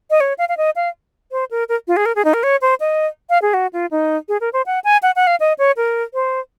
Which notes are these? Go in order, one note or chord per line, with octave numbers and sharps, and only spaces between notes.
D#5
C#5
F5
F5
D#5
F5
C5
A#4
A#4
F4
G#4
A#4
G#4
D#4
A#4
C#5
C5
D#5
F5
G#4
F#4
F4
D#4
G#4
A#4
C5
F#5
G#5
F#5
F#5
F5
D#5
C#5
A#4
C5